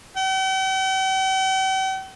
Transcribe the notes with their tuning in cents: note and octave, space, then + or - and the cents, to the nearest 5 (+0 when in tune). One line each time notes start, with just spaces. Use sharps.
G5 -45